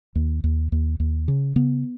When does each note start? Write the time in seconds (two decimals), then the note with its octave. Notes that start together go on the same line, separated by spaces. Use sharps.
0.15 D#2
0.44 D#2
0.72 D#2
1.00 D#2
1.28 C#3
1.56 C#3 B3